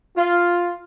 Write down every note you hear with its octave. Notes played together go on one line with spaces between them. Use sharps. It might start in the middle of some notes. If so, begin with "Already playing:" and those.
F4